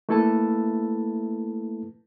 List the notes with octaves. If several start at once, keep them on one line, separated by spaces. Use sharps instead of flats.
A3 A#3 E4 A4 B4 A5